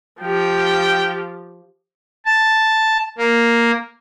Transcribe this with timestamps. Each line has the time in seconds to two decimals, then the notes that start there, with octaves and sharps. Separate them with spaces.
0.21 F3 G4 G5
2.26 A5
3.18 A#3